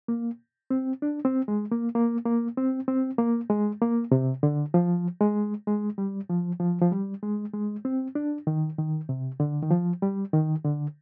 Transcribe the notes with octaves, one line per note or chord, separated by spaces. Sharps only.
A#3
C4
D4
C4
G#3
A#3
A#3
A#3
C4
C4
A#3
G#3
A#3
C3
D3
F3
G#3
G#3
G3
F3
F3
F3
G3
G#3
G#3
C4
D4
D#3
D#3
C3
D3
D#3
F3
G3
D#3
D3